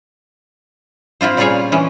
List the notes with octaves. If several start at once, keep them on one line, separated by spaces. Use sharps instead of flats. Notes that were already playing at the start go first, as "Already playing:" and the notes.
C4 E4 F4 C5
A#2 C#3 G3 F4 G#4 C#5
E3 C#4